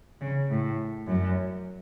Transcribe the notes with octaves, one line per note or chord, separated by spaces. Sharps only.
C#3
A2
F#2